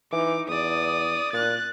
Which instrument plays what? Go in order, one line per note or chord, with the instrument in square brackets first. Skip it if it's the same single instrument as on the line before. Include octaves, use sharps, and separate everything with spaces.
[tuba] E3 [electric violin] D#4 D6
[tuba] E2 [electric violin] D5 D#6
[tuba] A#2 [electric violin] F#6 A6